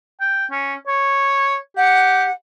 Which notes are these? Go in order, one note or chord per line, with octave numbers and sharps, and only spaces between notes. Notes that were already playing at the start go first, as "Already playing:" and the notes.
G5
C#4
C#5
G4 F#5